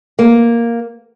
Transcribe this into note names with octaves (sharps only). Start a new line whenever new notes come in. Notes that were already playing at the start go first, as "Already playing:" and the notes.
A#3